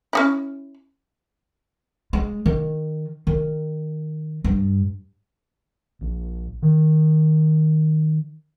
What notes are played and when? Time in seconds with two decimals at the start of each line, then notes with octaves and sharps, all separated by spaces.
0.13 C#4 D#4 E4
2.13 G#3
2.46 D#3
3.27 D#3
4.44 G2
6.01 A#1
6.62 D#3